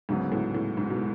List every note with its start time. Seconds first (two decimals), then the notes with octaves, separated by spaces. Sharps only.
0.09 D2 G#2 C#3 F#3 B3
0.32 A2
0.55 A2
0.77 G#2
0.90 B2